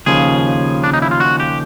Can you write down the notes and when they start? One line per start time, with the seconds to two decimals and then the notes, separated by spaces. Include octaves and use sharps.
0.06 D#2 C#3 F3 G#4
0.84 D4
0.93 D#4
1.02 E4
1.11 F4
1.20 F#4
1.40 G4